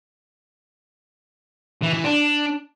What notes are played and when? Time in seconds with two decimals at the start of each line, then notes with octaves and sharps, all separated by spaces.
1.82 E3
1.93 E3
2.04 D4